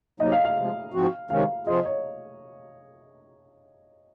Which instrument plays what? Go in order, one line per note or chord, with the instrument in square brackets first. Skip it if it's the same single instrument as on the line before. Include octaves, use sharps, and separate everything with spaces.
[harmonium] C3 F#3 A#3 D#4 [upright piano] D#5
[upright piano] F5
F5
[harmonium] C3 F3 G#3
G#2 F3 C4 F#4
[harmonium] C3 D#3 G#3 C#4 [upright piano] F5
[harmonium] C3 F3 C4 F4 G#4 [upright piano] D#5
[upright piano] C#5